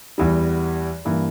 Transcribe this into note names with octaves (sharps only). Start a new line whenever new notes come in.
E2 E3 G3
G2 E3 A#3